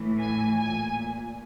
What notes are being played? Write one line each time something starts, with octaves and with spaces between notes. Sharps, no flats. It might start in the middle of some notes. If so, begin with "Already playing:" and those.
Already playing: A2 E3
G#5
A#2 G#5